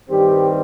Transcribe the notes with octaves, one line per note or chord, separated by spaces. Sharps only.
G2 D#3 G3 C4 G4